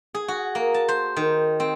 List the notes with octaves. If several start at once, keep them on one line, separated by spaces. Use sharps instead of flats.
G#4
F#4
A#3
A5
C5
D#3
C4